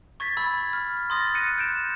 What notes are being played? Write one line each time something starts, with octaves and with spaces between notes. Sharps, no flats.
C#6 G#6 A6 B6
B5 E6 G#6
F6
C6 D#6 A6 A#6
F#6 A#6 C#7 D#7
G6 D7 E7